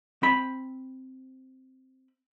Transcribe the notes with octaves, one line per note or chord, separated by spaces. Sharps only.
C4 B5